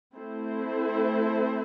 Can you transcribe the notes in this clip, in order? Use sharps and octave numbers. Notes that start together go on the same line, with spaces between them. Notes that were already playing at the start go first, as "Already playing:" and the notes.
A3 C4 E4 A4 C5